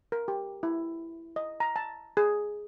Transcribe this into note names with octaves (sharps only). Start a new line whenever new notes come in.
A#4
G4
E4
D#5
A#5
A5
G#4